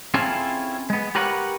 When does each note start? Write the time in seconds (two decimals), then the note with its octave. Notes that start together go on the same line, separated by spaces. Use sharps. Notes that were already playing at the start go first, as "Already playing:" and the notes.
0.14 C4 C#4 E4 F4 G#4 A4
0.90 G#3 B3
1.15 G4 A#4 B4 C#5 F5 F#5